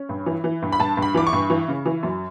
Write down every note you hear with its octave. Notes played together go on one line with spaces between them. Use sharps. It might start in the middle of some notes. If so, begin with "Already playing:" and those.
Already playing: C#4
G2
E3
E3
G2
B5
G2 A5
G2
B5
E3 D6
C#6
G2
E3
C#3
E3
F#2